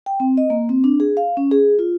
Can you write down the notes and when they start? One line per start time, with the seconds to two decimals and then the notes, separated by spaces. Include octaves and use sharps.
0.06 G5
0.20 C4
0.37 D#5
0.50 A#3
0.69 C4
0.84 D4
1.00 G#4
1.17 F5
1.37 C#4
1.51 G#4
1.79 F4